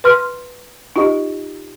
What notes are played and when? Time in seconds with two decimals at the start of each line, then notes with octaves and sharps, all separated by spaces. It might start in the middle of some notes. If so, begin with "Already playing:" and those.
0.04 B4 C6 F6
0.96 D#4 F4 G4 D#5